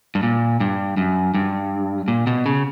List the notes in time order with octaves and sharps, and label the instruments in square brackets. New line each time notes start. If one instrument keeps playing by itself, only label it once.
[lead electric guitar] G2
A#2
G2
F#2
G2
A#2
B2
C#3